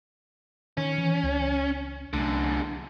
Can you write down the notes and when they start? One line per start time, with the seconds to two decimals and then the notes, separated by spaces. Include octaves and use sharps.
0.77 D#3 C#4
0.98 E3
1.24 C#2
2.13 C2 F#2 D3 A3